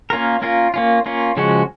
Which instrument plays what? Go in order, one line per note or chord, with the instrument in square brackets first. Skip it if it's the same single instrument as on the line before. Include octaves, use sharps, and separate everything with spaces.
[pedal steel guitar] A#3 C#4 F4 A#4
A#3 C#4 F4 A#4
A#3 C#4 F4
A#3 C#4 F4
C#3 F3 G#3 C#4 F#4